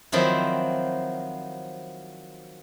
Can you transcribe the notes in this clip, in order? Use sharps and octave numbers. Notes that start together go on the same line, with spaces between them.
D#3 F3 F#3 C4 D#4 E4